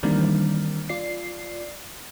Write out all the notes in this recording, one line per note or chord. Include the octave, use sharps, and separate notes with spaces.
D#3 E3 G3 A#3 C4 D4
F4 D5 C7